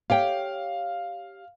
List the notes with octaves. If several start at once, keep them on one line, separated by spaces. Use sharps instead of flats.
G4 C#5 F5 G5